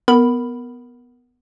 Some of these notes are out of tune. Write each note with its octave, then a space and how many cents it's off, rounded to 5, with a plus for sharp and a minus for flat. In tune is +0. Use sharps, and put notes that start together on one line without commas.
B3 +0 A#4 +0 B5 +0